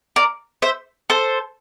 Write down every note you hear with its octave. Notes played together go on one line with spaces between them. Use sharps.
A#4 D5
C5 E5
A4 C5